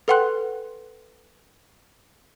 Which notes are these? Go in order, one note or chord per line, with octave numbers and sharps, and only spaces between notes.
A4 B4 F#5 G5 C6 F#6